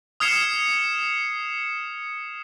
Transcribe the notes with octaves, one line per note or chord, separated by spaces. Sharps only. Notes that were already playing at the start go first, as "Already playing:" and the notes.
D#6 F6 G#6 C7 C#7 E7